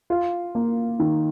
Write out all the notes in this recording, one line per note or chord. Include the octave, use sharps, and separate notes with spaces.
F4
A#3
D#3